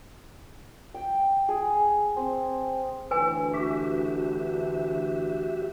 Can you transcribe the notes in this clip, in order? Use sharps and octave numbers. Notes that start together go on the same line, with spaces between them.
G5
G#4
C4
D2 E3 B4 G#5
F#4 G4 E5